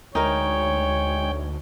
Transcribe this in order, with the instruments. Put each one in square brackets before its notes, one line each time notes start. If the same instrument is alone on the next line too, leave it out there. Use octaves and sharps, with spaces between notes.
[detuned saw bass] D2 [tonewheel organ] G#3 G5 [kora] D#4 A#4 [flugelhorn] C#5